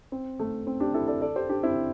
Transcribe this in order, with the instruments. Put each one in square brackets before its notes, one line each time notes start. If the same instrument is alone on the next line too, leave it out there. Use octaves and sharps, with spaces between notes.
[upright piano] C4
A3
C4
D4 G4
E4 A4
A4 D5
A4 D5
G4 C5
D4 G4
C4 E4